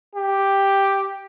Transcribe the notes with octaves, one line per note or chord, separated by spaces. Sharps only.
G4